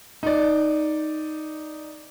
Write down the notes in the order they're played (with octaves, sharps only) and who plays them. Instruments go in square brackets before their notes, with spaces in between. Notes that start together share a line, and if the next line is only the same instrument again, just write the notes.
[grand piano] D#4 D5